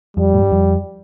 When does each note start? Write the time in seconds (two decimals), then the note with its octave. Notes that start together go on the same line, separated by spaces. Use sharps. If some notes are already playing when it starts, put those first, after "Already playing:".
0.17 F2 G3
0.34 A2
0.42 G2
0.52 F2